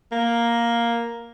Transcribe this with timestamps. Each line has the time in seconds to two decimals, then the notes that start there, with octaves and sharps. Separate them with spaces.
0.12 A#3